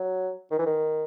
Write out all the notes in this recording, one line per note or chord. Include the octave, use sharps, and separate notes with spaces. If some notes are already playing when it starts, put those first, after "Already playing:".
Already playing: F#3
D#3
E3
D#3